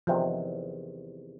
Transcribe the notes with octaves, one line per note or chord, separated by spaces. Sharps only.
E2 C3 D#3 F3